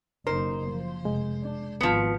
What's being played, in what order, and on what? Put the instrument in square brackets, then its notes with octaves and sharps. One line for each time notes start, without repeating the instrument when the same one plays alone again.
[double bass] F#1 D#4 [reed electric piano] A#4 [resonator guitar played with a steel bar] C5
[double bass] F3
[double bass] F1 [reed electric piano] G#3
[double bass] D4
[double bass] G#1 [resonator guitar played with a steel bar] F3 B3